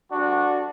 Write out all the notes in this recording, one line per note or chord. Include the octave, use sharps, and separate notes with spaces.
D2 D3 G3 D4 F#4